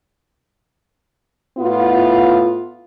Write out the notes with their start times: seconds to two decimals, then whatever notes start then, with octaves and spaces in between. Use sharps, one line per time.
1.58 A2 B3 E4 F4